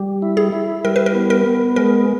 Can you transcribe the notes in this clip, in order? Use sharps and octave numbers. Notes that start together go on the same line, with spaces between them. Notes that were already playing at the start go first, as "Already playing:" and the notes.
Already playing: G3 G4
E4
G#4
E4
G3 A#4
B4
A#4
B3
A#4
B3
G#3 A#4